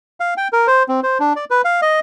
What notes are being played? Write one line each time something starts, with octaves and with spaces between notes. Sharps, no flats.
F5
G5
A#4
C5
C4
C5
D4
D5
B4
F5
D#5